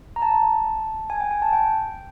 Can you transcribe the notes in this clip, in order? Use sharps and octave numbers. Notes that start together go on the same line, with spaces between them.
A#5
A5
G#5
G5
G#5
A5
G5